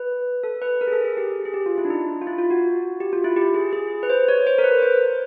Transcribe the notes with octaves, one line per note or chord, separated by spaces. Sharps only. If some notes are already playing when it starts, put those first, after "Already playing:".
Already playing: B4
A4
B4
A#4
G#4
A4
G#4
G4
G#4
G4
F4
E4
D4
D#4
F4
E4
F4
F#4
G4
F4
E4
G4
G#4
G#4
B4
C5
C#5
C5
A#4
B4
C5